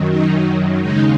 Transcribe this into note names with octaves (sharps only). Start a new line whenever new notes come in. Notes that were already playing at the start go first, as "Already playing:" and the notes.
Already playing: F#2 D#3 F#3
D#4
D#2 C#3 G#3 D#4